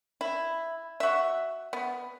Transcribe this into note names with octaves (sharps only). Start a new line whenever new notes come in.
E4
F#4 E5
B3